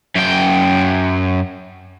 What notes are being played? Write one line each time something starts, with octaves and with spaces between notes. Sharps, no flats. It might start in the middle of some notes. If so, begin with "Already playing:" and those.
F#2 G5